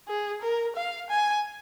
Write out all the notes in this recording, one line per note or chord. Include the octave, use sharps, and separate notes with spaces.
G#4
A#4
F5
G#5